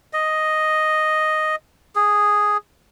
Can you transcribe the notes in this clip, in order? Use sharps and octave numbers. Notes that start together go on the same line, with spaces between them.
D#5
G#4